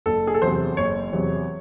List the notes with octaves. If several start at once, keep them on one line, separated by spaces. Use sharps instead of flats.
F#1 A4
G#4
A4
E2 C3 F#3 C5
F#1 C#5
E2 C3 F#3